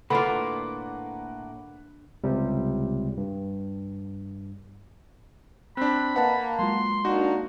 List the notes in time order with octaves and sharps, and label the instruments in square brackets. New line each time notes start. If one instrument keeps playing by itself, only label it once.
[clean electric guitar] A2 A#3 D5 [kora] D3 F4 [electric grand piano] B4 F#5 [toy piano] B5
[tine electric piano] C#2 C3 G3
G2
[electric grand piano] C4 D4 [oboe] B5 [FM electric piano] F#6
[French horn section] A#3 [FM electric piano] B4 D#5 [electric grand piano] F#5 A5
[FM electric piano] F#3 G#3 F4 [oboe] C6
[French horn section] A#3 D4 [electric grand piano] D#4 F#4